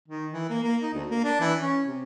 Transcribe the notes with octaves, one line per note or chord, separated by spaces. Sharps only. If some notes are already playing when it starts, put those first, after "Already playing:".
D#3
E3
A#3
A#3
D#4
D2
A#3
D4
E3
C#4
C3